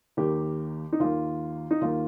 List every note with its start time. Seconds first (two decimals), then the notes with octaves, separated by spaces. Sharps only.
0.17 D#2 D#3 A#3 G4
0.92 D#4
1.00 D#2 D#3 A#3 F4
1.71 D#4
1.81 D#2 D#3 A#3 F4